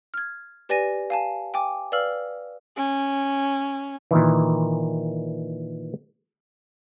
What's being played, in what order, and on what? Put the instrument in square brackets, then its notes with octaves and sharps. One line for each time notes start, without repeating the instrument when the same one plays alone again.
[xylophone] F6 G#6
G4 B4 D5 G#5 A#6 D#7
F5 G#5 A5
G5 G#5 D6
B4 D5 F5 E6 F6 F#7
[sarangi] C#4
[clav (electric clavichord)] A#2 D#3 E3